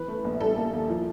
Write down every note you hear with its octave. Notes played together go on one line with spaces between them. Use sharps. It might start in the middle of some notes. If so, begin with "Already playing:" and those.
Already playing: E3 B4
A3
A#1
G3 A4
A#3
D#2
F3